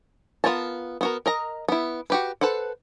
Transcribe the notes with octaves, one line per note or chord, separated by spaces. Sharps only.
B3 F4 A#4 C#5 A5
B3 F#4 A#4
A#4 D#5 A#5
B3 E4
F#4 G4 B4
A4 B4 C5 F#5